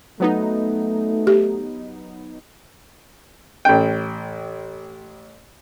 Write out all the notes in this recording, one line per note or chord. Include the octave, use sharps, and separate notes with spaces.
F#3 A3 B3 D#4
G4
A1 G5